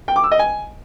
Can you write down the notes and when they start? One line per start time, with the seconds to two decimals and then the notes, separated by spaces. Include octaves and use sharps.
0.08 G5
0.16 D6
0.24 E6
0.32 D#5
0.39 G#5